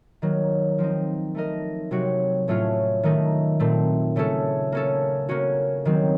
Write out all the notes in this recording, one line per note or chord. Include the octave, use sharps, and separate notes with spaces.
D#3 F#3 A#3
F3 C4 D#4
A3 D#4 A#4 D#5
C3 F#3 C4 F#4
A2 F#3 A3 C#4 F4
D#3 A3 D#4
A#2 A3 C4
C#3 A3 C#4 A4
A#3 C#4 A4
A#3 C#4 F#4
D#3 F#3 C4